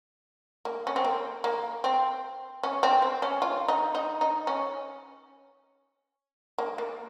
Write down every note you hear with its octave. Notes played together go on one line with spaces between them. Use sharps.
A#3
C#4
C4
A#3
A#3
C4
C#4
C4
C4
C#4
F4
D#4
D#4
D#4
C#4
A#3
A#3